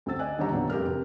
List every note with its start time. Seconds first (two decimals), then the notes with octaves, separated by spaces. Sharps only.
0.06 D2 D3 C4 E6 A6
0.19 D5 D#5 G#5 F#6
0.38 D#1 D3 D#3 G4 C#5 A#5
0.52 E2 A#2 C#3 F#3 G3 D4
0.70 F1 G4 A#4 F6
0.88 C3